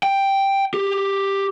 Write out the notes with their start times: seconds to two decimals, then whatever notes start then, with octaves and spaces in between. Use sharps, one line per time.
0.03 G5
0.74 G4